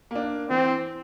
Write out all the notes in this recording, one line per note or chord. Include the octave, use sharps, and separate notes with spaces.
A#3 D4
E3 C4